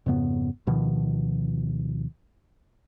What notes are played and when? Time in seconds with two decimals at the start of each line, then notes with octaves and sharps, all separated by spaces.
0.06 F2 G#2 C#3 B3
0.67 D2 B2 D#3 F3